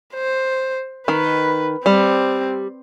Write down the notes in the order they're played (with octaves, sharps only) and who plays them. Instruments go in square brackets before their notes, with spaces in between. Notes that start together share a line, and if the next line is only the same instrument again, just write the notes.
[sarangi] C5
[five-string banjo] D#3 [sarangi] B4
[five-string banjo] G3 [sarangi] C4